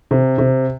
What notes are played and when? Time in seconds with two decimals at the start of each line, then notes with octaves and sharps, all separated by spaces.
0.11 C3
0.38 C3